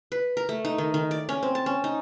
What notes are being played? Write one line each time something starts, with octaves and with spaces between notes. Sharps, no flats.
B4
A#4
A3
D#4
D#3
D#3
D5
C#4
C4
A5
C#4
D#4